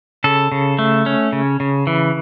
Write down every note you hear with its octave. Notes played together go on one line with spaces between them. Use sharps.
C#3 A4
C#3
A3
C#4
C#3
C#3
E3